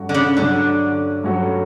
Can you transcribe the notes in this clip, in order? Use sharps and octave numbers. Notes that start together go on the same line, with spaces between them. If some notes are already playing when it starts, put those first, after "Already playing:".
Already playing: G2 F#3 C#4 F#4 A4
D3
C#3
G2 D3 F#3 C#4 F#4 A4
G2 F#3 C#4 F#4 A4